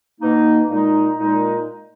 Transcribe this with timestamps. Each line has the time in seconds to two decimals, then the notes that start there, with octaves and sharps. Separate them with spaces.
0.21 B2 A#3 D#4
0.69 A#2 G#3 D#4
1.18 A#2 G#3 D#4